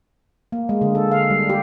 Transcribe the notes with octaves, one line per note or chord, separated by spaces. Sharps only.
A#3
G#3
D3
A4
F5
G3
G4